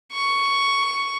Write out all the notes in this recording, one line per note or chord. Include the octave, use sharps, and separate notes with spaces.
C#6